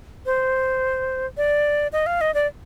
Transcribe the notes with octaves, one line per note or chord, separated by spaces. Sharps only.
C5
D5
D#5
F5
D#5
D5